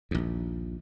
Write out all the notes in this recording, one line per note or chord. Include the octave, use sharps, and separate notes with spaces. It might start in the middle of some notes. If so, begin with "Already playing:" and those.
A#1 D#2